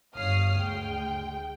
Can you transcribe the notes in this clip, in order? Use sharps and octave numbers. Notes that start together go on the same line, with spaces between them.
G1 C#5 F5 D#6 F6 C7
D2 G#3 G5